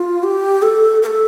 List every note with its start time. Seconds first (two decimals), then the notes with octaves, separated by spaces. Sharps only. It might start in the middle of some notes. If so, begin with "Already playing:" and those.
Already playing: F4
0.23 G4
0.62 A4
1.02 A#4
1.07 A4